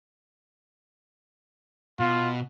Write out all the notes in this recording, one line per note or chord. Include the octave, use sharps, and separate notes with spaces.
B2 F4